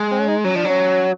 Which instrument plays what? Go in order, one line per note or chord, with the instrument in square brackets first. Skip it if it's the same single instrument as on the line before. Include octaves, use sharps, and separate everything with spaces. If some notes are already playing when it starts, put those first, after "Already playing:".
Already playing: [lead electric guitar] G#3
[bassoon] C4
C#4
D#4
[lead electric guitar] F#3 [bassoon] C#4
[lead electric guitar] F3 [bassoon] D4
[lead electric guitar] F#3
[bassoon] C#4